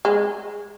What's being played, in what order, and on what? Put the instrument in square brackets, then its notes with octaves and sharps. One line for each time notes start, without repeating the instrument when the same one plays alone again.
[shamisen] G#3